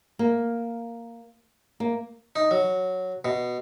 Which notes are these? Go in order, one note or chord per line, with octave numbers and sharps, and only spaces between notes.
A#3
A#3
D#4
F#3
B2